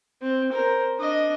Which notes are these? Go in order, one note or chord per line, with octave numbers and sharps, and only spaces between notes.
C4
A#4 C5
D4 D#5